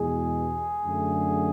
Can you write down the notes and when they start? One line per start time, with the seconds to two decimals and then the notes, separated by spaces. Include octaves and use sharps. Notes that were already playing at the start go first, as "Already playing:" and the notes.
Already playing: E2 B2 G#3 G#4
0.83 F#2 D3 A3